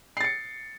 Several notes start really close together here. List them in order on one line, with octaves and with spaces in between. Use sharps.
C7 A6 C#7